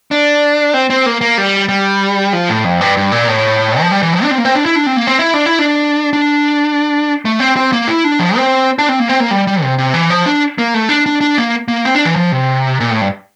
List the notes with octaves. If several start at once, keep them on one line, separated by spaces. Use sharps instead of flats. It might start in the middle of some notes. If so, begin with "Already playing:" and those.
D4
C4
C4
A#3
A#3
G3
G3
F3
A2
F2
G2
G2
A#2
A2
F3
G3
E3
F3
D4
C4
A#3
C4
D4
E4
D4
C4
A#3
C4
E4
D4
E4
D4
D4
A3
C4
C4
A#3
E4
D4
F3
C4
D4
C4
A#3
C4
A#3
G3
G3
C3
C3
E3
F3
D4
A#3
A3
D4
D4
D4
A#3
A#3
C4
D4
E3
F3
C3
A#2
A2
G2